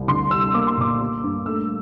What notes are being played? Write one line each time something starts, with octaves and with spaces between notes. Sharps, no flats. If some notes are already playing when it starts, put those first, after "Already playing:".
Already playing: C2
D2 C6
G3 E6
A#3 D6
C6
A#2 D6
A#3
G2
A3 E6